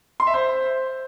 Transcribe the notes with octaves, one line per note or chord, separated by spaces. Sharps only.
C6
E5
C5